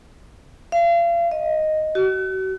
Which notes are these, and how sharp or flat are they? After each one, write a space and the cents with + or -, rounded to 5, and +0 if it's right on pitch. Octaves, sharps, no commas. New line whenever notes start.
F5 -40
D#5 +0
F#4 +40